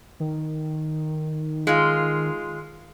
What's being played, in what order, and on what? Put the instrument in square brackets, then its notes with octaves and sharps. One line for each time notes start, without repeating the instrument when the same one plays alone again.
[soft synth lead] D#3
[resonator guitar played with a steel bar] G#3 F4